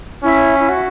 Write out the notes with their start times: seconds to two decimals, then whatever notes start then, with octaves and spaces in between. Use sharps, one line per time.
0.23 C#4 E4
0.59 E4
0.69 F#4